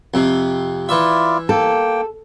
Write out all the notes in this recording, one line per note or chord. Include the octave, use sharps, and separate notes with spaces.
F2 C3
E3 E4 F4 D5 E5
A#3 A4 G5